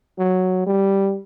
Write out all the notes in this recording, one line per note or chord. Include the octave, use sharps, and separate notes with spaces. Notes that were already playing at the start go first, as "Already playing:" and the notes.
F#3
G3